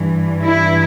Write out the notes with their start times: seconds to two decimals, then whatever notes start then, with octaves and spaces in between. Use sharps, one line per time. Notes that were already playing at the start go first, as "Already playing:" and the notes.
Already playing: G2 E3
0.43 E4